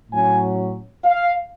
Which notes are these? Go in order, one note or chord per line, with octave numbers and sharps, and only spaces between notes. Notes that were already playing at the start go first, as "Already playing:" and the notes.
A2 F#3 C#4 G#5
F5